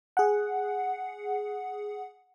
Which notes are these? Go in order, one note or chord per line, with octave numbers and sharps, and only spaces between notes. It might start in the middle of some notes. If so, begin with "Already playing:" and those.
G#4 F#5